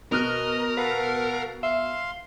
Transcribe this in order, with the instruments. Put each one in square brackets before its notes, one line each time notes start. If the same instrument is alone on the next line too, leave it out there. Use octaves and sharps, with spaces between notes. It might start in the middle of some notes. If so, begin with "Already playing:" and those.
[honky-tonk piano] B2 F6 F#6 [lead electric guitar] A#4 [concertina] D#5
[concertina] A4 F5 F#5 [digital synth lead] B4
[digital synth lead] E5 [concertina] F5 C6